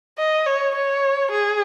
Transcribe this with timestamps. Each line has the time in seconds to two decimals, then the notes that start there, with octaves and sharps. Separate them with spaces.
0.18 D#5
0.46 C#5
0.75 C#5
1.31 G#4